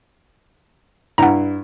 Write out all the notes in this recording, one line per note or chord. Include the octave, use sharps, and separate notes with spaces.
G2 E4 F#5 A#5